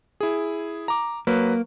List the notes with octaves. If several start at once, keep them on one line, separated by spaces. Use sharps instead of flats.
E4 G#4
A#5 D6
F#3 A#3 B4